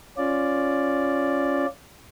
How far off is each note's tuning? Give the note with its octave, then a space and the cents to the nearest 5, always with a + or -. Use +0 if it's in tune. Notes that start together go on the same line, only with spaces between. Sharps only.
C#4 -5 F4 +0 D5 +0